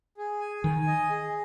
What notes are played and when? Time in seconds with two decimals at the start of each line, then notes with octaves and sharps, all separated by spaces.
0.17 G#4
0.40 G#5
0.64 D#3 G#5
0.87 D#5
1.10 G#4